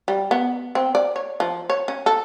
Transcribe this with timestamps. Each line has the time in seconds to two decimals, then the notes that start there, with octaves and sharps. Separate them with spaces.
0.08 G3
0.31 B3
0.75 C4
0.95 D5
1.16 C#5
1.40 F3
1.70 C#5
1.88 C#4
2.06 A4